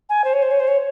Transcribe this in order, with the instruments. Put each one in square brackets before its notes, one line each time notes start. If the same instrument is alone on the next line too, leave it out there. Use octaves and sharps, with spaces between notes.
[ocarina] G#5
C5
C#5
C5
C#5
C5
C#5